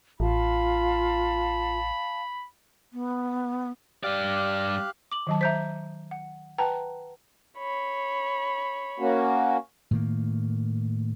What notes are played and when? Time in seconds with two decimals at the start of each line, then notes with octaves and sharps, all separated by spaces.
0.20 A1 F4 F5 A5 B5
2.93 B3
4.03 G2 G4 D5 F5 F#6
5.12 D6 F#7
5.27 D#3 F#3 A5
5.41 C5 E5 A#5 G6 B6
6.11 F#5
6.58 B4 F#5 G5 A5 A#5
7.58 C#5 B5
9.00 A#3 C#4 F#4
9.91 A2 D#3 A#3